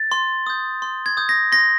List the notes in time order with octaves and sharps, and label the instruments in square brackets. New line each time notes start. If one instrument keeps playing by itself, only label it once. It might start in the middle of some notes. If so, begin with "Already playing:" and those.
Already playing: [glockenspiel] A6
C6
D#6 G6
C6
G#6
D#6 G6
A#6
C6 A#6